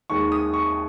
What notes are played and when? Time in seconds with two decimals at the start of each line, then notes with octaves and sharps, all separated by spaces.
0.10 D#2 D#3 G#3 C#6
0.32 D#6
0.54 C#6